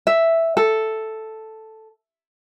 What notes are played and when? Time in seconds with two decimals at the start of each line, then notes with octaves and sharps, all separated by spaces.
0.07 E5
0.57 A4